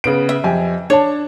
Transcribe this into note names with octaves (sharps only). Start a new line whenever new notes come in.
C#3 B3 D7
E5
F2 G4 G#5
D4 C#5 A5